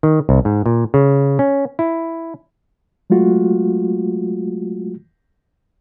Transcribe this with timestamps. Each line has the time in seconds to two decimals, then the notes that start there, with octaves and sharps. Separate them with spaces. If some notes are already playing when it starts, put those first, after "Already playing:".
0.03 D#3
0.29 C2
0.45 G#2
0.66 A#2
0.94 C#3
1.39 C#4
1.79 E4
3.10 F#3 G#3 A3 F4 F#4